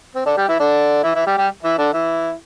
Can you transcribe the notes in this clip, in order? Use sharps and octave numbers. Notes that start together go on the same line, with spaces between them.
C4
D3 D4
G3 G4
E3 E4
D3 D4
E3 E4
E3 E4
G3 G4
G3 G4
E3 E4
D3 D4
E3 E4